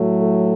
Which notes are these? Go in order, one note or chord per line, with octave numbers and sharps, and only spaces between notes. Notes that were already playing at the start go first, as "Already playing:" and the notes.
Already playing: A2 F#3 A3
A4